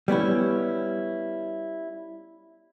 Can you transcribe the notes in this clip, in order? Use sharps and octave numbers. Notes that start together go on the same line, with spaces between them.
G3 B3 C#4 E4